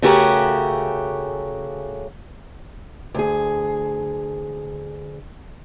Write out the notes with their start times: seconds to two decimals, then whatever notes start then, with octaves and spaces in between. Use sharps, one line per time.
0.02 C#3 A3 C#4 F#4 G4 A#4
3.14 D2 G#4